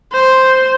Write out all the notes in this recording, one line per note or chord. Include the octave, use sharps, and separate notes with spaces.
C5